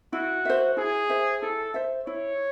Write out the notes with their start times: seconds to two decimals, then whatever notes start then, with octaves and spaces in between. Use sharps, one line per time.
0.13 E4 F#4
0.45 C5 E5
0.77 E4 G#4
1.09 C5 E5
1.42 E4 A4
1.74 C5 E5
2.07 E4 C#5